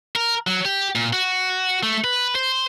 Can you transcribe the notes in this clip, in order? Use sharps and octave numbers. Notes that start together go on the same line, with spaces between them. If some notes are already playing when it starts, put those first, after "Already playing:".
A#4
F#3
G4
A#2
F#4
A3
B4
C5